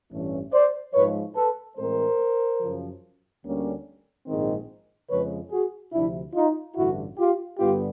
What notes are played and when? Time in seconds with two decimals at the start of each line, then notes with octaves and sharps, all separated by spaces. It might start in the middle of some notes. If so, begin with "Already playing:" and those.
0.11 A1 G2 E3 A3 C#4
0.53 C5 D5
0.93 G#2 F3 G#3 B4 C#5
1.35 A4 B4
1.77 A2 E3 G#3 C4 A#4 C5
2.60 F#2 C#3 F3
3.43 D2 D3 G3 A#3 C#4
4.26 A#1 G#2 D#3 G#3 C4
5.09 F2 C#3 F3 G#3 B4 C#5
5.51 F#4 G#4
5.93 D2 C3 F3 D4 E4
6.34 D#4 F4
6.76 A1 G2 D3 E4 F#4
7.18 F4 G4
7.59 G2 D3 G3 B3 F4 G4